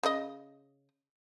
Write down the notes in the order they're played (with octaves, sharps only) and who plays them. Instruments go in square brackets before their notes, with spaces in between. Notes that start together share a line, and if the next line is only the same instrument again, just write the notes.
[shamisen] C#3 D5 D#5